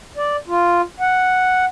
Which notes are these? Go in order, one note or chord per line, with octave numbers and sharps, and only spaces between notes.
D5
F4
F#5